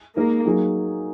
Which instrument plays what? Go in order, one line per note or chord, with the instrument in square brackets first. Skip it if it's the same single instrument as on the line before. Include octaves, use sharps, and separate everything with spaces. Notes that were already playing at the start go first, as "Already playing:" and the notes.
[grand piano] G#3 D#4 A#4 [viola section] A#3
[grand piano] F#3 A#3 D#4 G#4